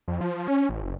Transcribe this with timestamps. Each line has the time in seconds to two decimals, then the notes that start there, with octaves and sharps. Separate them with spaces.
0.08 F2
0.21 F3
0.48 C#4
0.69 A1
0.82 F#1